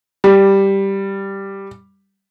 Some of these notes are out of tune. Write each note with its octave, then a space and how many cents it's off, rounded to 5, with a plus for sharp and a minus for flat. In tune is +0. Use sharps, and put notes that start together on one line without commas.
G3 +0